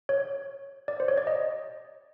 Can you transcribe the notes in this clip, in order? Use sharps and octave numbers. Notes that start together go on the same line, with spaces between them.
C#5
D5
C5
C#5
D5
D#5